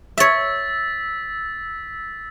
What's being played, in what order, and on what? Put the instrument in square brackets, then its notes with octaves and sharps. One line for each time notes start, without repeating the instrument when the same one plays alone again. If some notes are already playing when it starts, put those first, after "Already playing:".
[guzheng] C#5 E5 [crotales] E6 A6 B6